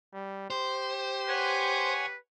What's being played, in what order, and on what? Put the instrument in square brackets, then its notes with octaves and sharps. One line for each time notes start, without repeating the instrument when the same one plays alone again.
[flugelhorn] G3
[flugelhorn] G4 [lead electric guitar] C5
[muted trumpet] B4 [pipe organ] C#5 F#5 G#5